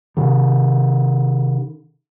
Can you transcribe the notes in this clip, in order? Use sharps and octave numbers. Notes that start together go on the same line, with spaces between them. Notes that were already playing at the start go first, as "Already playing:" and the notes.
C3 D#3